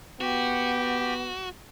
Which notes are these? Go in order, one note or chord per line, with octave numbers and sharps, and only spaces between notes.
B3 F#4 G4